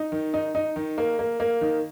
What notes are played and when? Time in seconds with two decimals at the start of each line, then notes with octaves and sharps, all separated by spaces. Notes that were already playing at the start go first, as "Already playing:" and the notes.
Already playing: D#4
0.12 D#3
0.34 D#4
0.55 D#4
0.76 D#3
0.98 A#3
1.19 A#3
1.40 A#3
1.61 D#3